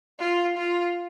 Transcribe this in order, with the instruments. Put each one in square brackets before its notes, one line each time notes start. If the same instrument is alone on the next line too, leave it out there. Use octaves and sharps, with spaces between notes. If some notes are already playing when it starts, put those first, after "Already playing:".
[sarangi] F4
F4